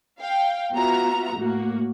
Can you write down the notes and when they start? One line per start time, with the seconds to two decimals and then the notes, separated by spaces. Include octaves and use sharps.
0.21 F5 G5
0.73 B3 F4 F#4 E5 A#5
1.37 A2 A#3 F#4